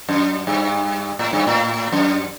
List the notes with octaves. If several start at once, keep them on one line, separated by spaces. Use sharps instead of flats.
F#2
G2
A2
G2
A2
F#2